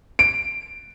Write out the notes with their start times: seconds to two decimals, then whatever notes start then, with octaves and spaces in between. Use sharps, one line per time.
0.19 D7